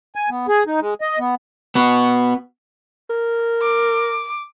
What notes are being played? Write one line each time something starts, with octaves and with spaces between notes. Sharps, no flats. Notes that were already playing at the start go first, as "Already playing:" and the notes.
G#5
B3
G#4
D#4
G#3
D#5
B3
B3 F#4
A#4
D6